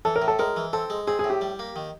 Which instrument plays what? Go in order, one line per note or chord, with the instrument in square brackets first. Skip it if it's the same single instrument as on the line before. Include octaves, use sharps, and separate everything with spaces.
[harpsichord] E3 [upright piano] A4
[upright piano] A#4
[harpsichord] A2
[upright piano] A4
[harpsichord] G#3 [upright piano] A#4
[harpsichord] E3
[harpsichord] C4 [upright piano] A4
[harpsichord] G#3
[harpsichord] C4 [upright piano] G#4
[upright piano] G#4
[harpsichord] A2
[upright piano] G4
[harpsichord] G3
A#3
D#3